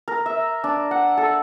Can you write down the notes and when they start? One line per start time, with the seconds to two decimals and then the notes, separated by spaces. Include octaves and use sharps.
0.08 A#4
0.26 E5
0.64 D4
0.91 F#5
1.17 A4